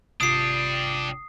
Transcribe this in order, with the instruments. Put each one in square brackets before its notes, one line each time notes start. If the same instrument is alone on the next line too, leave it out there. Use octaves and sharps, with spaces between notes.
[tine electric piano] G#1 C3 F4 [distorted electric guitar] D4 G4 [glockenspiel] D#6 C7